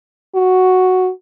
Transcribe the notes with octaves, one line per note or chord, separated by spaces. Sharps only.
F#4